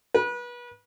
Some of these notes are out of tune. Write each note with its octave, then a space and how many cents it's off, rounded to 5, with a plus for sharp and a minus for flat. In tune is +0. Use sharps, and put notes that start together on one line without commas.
B4 -30